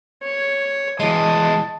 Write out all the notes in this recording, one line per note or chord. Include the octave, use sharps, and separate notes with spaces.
C#5
E3 G#3 D#5 A5 D#6